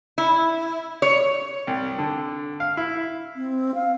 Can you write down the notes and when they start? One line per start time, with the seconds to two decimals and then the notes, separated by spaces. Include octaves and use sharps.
0.18 E4
1.02 C#5
1.67 C2
1.98 D3
2.60 F5
2.77 E4
3.36 C4
3.75 F5